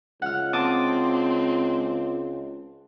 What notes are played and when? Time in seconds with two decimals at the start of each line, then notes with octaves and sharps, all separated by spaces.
0.22 C#2 F#5 F6
0.53 C4 A5 D6 D#6